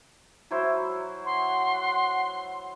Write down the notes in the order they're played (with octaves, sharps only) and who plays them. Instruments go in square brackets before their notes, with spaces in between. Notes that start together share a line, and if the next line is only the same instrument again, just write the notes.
[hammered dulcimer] F#3 E4 C5
[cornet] F#5 [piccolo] C6